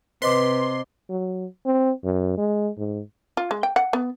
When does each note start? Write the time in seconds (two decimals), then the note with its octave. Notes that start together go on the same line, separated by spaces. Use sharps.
0.22 C3 B4 C5 D#5 C6 D6
1.10 F#3
1.66 C4
2.04 F#2
2.37 G#3
2.78 G#2
3.37 F4
3.51 G#3
3.63 G5
3.76 F#5
3.93 B3